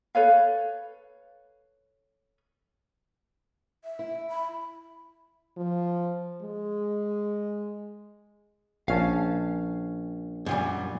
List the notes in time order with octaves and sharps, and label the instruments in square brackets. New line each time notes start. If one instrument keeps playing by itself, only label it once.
[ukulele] A4 B4 C#5 F5
[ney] E5
[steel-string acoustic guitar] E4
[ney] B5
[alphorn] F3
G#3
[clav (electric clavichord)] A#1 C#4 A5 [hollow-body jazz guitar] F5
[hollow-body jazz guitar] F#2 A#2 G3